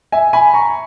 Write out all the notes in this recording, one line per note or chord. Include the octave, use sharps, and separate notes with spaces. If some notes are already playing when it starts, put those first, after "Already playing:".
E5 G#5
G#5 B5
A#5 C#6